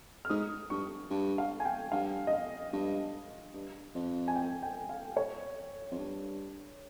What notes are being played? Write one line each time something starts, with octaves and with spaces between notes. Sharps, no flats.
F6
G#2 D#6
G2 C#6
G2
F5
G#5
G5
G2 F5
D#5
F5
G2
G2
F2
G#5
G5
G5
F5
C#5
F2
G2